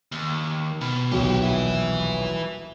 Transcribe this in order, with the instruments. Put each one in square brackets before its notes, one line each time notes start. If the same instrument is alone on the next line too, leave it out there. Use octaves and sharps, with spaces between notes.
[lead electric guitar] D#2
[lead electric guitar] B2 [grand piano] B5
[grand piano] D#1 B1 B2 [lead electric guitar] F#4 G4
[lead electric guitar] B4 E5